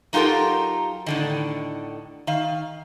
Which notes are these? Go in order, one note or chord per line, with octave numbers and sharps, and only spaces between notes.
F#3 D#4 F4 G4 A4 A#4
A2 D3 D#3
D#3 F5